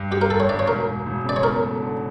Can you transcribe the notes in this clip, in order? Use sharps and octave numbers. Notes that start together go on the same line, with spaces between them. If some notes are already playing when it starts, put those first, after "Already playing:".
Already playing: G2
G2 G4
A#4
G1 A4
C#5
G2 D5
C#5
E1 A#4
E1
E1
C#3 D5
C#5
E2 A#4
A3
D3